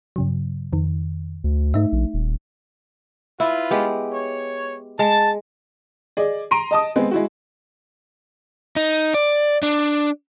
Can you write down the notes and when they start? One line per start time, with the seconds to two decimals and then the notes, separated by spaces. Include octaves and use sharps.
0.16 G2 C#3 F#3
0.73 F2 D#3
1.44 D2
1.74 G#2 A3 D#4 E5
1.92 A#1
2.14 D#1
3.40 E4 F4 B4
3.71 G#3 B3 G4
4.12 C#5
4.99 G#3 A5
6.17 G#4 D5 D#5
6.51 A#5 C6 D7 D#7
6.71 D#5 A5 D#6
6.96 G#3 B3 C4
7.11 G#3 E4 F#4
8.76 D#4
9.14 D5
9.63 D4